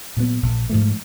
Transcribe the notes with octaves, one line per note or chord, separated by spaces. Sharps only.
A#2 F#3 B3
A#1
G#2 F3 A3